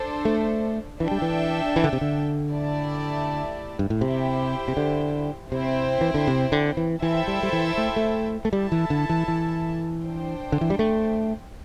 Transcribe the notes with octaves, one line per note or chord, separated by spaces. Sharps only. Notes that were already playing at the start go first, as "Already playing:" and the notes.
Already playing: D4 A4 C5
A3
E3 D4 A4 E5 G5
G3
E3
E3
D3
C3
D3
A3 E4 G4 D5 A5
G2
A2
C3 E4 G4 C5 G5
C3
D3
C3 C4 E4 C5 G5
E3
D3
C3
D3
E3
E3 E4 A4 C5 E5 G5
G3
G3
E3
A3
A3
A3
G3 E4 A4 E5 A5
E3
D3
E3
E3
D4 C5 G5
D3
E3
G3
A3